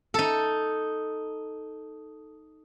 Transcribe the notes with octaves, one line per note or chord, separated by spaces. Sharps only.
D#4 A4